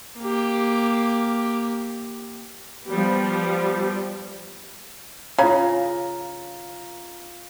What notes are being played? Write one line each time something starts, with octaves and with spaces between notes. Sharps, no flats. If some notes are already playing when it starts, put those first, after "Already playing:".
A#3 G4
F3 G3 B3
C#3 F4 A#5